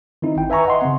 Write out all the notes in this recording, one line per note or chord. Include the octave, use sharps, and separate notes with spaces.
D#3 C4 D#4 E4
G#1 G5
B4 E5 G#5 A#5 C#6
D#5 F#5 C6
C#3 C4